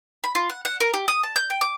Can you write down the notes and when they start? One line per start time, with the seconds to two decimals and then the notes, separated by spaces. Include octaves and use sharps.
0.24 B5
0.35 F4
0.50 F#5
0.65 F#5
0.80 A#4
0.94 G4
1.08 D#6
1.23 A5
1.36 G6
1.50 G5
1.61 D6